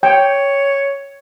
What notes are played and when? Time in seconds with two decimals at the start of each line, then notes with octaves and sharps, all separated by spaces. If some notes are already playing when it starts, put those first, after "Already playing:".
0.03 C#5 G5